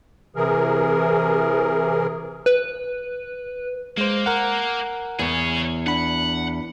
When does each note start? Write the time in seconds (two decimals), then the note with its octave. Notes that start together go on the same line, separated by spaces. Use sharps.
0.36 C3 E3 G#4 A#4
2.46 B4
3.98 G#3 A#3 C5
4.26 A#4 F#5
5.19 E2 G#4 C#5
5.87 D4 F#5 B5